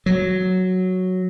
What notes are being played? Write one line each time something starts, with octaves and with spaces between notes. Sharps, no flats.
F#3